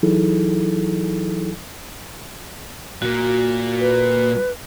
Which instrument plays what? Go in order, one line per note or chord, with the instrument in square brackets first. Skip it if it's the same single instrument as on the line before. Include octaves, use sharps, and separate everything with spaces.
[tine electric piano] E3 F#3 D#4 E4 G#4 A4
[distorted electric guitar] A#2 A#3 [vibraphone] F#4
[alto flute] B4